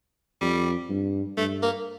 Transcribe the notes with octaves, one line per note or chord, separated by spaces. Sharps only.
F2 G3
G2
G2 A3
A#3